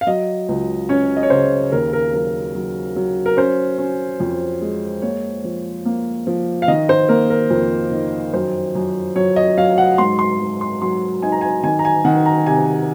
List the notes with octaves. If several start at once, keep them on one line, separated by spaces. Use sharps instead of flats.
F5
F#3 D#5
C#2
C#4 C#5
D#5
C#5
C#3 C5
D#2 A#4
A#4
F#3 A#4
F#3
F#3
A#4
C#4 C5
C#4
F2
G#3
A#3 C#5
F3
A#3
F3
F5
D#3 D#5
C5
A#3 A#4
A#4
F2 A#4
D#3
F#2 C5
F#2
F#3 C#5
D#5
F#3 F5
F#5
G#2 C6
C6
F#3
C6
F#3 C6
D#4 G#5
A#5
G#5
D#3 G#5
A#5
G#5
D#3 F#5
A#5
C3 G#5